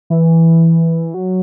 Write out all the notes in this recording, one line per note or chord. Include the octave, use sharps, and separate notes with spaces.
E3
F#3